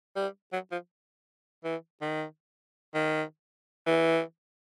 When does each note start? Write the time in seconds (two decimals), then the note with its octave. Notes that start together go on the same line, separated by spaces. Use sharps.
0.16 G3
0.53 F#3
0.72 F3
1.64 E3
2.01 D#3
2.94 D#3
3.87 E3